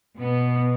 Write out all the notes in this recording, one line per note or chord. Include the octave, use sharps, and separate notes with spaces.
B2 B3